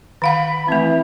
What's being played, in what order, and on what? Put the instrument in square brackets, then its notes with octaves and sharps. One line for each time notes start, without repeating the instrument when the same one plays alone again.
[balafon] D#3 F5 F#5 [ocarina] B5
[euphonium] E3 [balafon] A3 C4